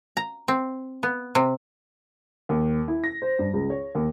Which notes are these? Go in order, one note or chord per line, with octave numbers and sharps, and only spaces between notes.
A#5
C4
B3
C3
D#2
E4
A#6
C5
G2
C#2
C#5
D#2